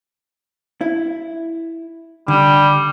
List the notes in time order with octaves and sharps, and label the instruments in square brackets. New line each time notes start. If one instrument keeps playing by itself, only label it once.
[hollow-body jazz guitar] E4
[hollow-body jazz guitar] D3 [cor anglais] G3